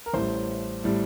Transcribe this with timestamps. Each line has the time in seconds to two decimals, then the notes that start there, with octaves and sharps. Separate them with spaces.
0.06 A#4
0.13 A1 A2 G3 C5
0.84 A2 G3